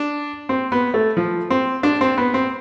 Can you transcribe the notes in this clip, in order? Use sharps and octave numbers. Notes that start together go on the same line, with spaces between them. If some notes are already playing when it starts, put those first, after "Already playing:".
Already playing: D4
C4
B3
A3
F3
C4
D4
C4
B3
C4